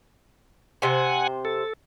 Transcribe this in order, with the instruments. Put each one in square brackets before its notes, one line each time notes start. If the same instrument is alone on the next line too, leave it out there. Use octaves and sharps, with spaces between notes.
[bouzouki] C3 C5 [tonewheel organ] F#5 G#5
[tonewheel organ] A4